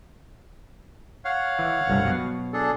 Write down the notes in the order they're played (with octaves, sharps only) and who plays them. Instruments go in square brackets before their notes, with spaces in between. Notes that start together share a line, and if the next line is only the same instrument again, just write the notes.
[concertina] C#5 F5 F#5
[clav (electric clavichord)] E3
G1 C2 G2
B2 F#3
[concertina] D4 G#4 A4